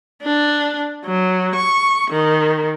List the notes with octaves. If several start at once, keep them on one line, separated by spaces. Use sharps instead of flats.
D4
F#3
C#6
D#3